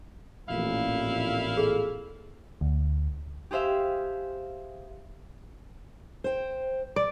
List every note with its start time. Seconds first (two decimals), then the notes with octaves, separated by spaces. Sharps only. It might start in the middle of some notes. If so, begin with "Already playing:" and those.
0.48 A1 F2 A#2 E4 F5
1.57 G#4 A4
2.61 D2
3.51 G4 G#4 C5 E5 F5
6.24 C5 G5
6.96 D5